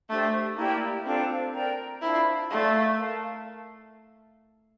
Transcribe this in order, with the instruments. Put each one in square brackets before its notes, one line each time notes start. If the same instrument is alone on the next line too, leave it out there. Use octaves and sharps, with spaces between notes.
[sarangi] A3 [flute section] D4 G4 C5
[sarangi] A#3 [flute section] E4 G4 D5 G5
[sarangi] C4 [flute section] D4 F4 A4 C5
[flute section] A#4 D5 G5 A#5
[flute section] D4 F4 C5 [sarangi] E4
[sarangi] A3 [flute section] A4 D5 F5 C6
[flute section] A#4 F5 A5